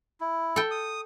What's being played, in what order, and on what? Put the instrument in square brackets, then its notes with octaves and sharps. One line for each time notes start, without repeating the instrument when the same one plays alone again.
[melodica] E4
[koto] A4 G5
[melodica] D#6